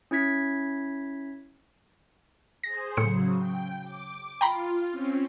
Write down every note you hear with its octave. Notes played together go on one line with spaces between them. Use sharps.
C#4 E4 G#6 B6
G#4 C5 A#6
A2 C#3 F#3 C#7
G5
D6
F4 G5 A#5 B5
C4 C#4